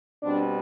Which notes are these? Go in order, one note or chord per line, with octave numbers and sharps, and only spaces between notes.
B2 G3 C4 D4